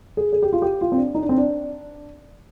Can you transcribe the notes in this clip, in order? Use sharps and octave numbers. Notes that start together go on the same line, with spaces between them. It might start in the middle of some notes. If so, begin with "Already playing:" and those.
G#4
G#4
G4
F4
G4
F4
C4
D4
D#4
D4
C4
D4